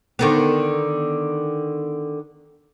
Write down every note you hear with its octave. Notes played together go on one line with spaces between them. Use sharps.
D3 D#3 B3